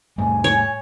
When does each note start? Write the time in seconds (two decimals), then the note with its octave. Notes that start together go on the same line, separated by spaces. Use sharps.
0.18 A2 G3 A3 G#5
0.44 C#5